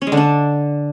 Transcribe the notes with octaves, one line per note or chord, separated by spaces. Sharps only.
C#4
G#3
D3
D4